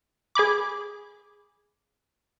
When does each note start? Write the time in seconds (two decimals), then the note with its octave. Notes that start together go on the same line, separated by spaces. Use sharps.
0.35 G#4 G#5 B5 D6